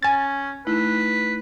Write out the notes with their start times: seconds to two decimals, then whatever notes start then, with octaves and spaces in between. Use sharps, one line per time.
0.03 C#4 G#5 A6
0.67 A3 D#4 E4 B4